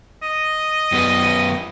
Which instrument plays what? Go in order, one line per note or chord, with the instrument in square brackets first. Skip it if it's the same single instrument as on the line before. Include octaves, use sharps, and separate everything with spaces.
[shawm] D#5
[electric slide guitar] F#2 B3 B4